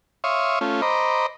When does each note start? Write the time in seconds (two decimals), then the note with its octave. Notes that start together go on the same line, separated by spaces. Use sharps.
0.24 C#5 E5 F5 C6 C#6 D#6
0.61 A3 C#4 F4
0.82 C5 D#5 A#5 B5 D6